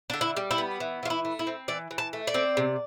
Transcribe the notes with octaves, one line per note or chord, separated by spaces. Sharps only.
D3 D4
E4
G3
E4
B3
E3
E3 F4
E4
A3
E4
C4
E3 D5
E3
A5
A3
D5
C4
C3